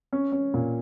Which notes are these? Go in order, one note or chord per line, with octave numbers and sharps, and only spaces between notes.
C#4
C#4
A#2